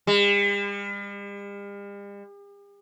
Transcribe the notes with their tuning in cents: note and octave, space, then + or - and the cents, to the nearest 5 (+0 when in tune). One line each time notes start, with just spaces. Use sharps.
G3 +45